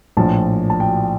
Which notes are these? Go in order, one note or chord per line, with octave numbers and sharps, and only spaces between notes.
A#1 A2 F3 A5
A5
G5